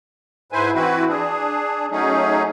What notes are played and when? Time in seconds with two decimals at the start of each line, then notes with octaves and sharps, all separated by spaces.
0.52 G#2 E4 B4 C5 G#5
0.74 E3 C4 E4 F#4 B4
1.08 D4 G#4
1.91 F#3 A3 C#4 D#4 G#4